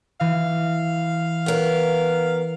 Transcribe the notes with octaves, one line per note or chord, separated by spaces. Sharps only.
E3 F5
B3 A#4